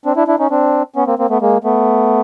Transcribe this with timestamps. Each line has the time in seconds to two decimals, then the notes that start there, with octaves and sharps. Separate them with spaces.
0.06 C4 D4
0.16 D4 E4
0.27 D4 E4
0.39 C#4 D#4
0.51 C4 D4
0.96 B3 C#4
1.07 A#3 C4
1.19 A#3 C4
1.30 A3 B3
1.41 G#3 A#3
1.64 A3 B3